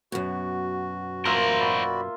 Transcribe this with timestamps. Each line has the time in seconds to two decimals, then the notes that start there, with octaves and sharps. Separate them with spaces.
0.12 F#2 B2 F#4
1.25 A#3 F4 A#4 C5 E5
1.60 F#4 D5 B5